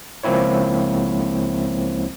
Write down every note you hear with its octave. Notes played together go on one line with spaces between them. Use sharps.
C#2 F3 A#3 C4 E4 C#5